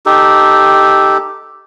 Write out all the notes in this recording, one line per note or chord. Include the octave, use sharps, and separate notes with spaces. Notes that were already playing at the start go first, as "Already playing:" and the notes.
D#4 G4 A4